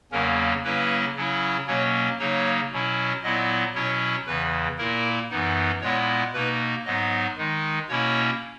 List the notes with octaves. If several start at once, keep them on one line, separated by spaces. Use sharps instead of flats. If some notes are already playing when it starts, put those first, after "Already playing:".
E2 C#3 F#3 A#3 C#4 A#4
C#3 F#3 A#3 C#4 E4 B4
C#3 F#3 C#4 E4
B2 F#3 A#3 C#4 C#5
C#3 F#3 A#3 D#4 C#5
B2 F#3 C#4 E4
A#2 F#3 B3 E4 D#5
B2 F#3 C#4 E4 C#5
E2 C#3 E3 B4
A#2 A#3 E4 A#4
F#2 E3 B3 D#4
A#2 G#3 B3 E4 C#5
B2 A#3 D#4 B4
G#2 F#3 B3 D#4 D#5
D#3 G#3 D#4
B2 A#3 C#4 E4 C#5